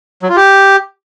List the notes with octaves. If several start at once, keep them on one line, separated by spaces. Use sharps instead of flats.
F#3
F4
G4